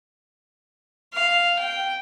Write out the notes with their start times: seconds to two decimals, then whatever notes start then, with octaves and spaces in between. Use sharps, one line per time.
1.14 F5
1.60 G5